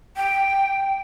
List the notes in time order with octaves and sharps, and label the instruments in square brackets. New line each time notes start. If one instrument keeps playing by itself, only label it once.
[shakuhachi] G5